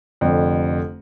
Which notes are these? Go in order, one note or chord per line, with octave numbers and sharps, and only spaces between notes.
F1 F2 D3